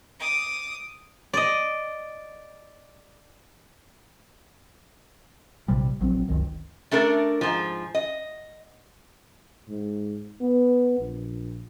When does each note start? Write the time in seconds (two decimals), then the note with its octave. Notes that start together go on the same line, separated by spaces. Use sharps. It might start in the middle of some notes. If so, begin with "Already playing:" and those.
0.19 D6 D#6
1.34 D5 D#5
5.68 A#1 C3 G3
6.01 A#1 F#3 C4
6.29 F#1 C#2 D#3
6.91 A3 D4 A4 A#4
7.41 G#2 F3
7.95 D#5
9.69 G#2
10.41 B3
10.99 A#1